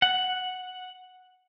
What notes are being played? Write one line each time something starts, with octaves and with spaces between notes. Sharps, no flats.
F#5